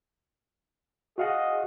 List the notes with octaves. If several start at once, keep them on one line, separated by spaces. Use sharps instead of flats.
F#4 G#4 D#5 F5 F#5